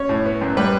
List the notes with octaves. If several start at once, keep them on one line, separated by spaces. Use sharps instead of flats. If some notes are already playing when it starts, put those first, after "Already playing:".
Already playing: C#4 C#5
A2
B3
F#2
G3 B4